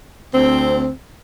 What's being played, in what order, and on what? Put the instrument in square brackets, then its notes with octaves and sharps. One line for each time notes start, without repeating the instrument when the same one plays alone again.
[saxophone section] D2 C4